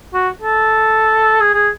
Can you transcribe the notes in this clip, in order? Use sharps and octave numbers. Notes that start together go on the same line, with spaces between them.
F#4
A4
G#4
G#4